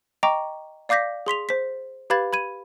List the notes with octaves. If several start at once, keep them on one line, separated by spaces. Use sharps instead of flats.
D#5 G5 A#5 C#6 D6
D5 F5 D6 G6 A#6 B6
G#4 C6 B6 F7
C5 B6
G4 B4 F5 B5 G#6 A6
B5 G#6 D#7